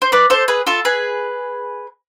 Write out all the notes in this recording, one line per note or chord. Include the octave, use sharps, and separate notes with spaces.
C5
B4 D5
A4 C5
G#4 B4
F4 A4
G#4 B4